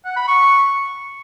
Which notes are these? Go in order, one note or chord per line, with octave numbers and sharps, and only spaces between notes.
F#5
B5
C#6